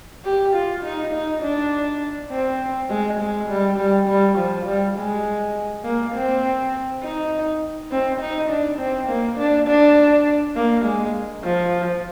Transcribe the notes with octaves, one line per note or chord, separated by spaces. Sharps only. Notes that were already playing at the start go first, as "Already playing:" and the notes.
G4
F4
D#4
D#4
D4
C4
G#3
G#3
G3
G3
G3
F3
G3
G#3
A#3
C4
D#4
C4
D#4
D4
C4
A#3
D4
D4
A#3
G#3
F3